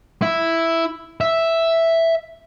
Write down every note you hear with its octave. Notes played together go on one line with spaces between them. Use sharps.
E4
E5